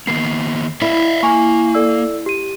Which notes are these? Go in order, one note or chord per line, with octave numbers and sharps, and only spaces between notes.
D#3 A#3 B3 C7
E4 D5 E5 F5
A#3 G#5 C#6
A4 D5 E6
G4 D#7